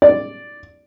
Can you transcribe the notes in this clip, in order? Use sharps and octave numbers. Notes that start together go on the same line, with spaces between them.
D5